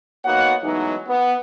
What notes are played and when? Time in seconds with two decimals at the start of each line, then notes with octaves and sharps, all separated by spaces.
0.25 A#3 B3 D#4 F#4 C#5 F#5
0.63 E3 F#3 G#3 A3 B3 D#4
1.07 B3